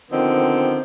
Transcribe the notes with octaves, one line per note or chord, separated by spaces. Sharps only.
D3 D#3 F3 B3 C4